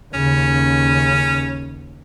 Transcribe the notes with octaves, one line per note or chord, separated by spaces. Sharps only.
D#2 C#3 C#4